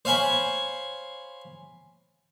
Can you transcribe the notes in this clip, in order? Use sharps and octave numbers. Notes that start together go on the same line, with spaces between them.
C5 C#5 F5 G#5 B5 C#6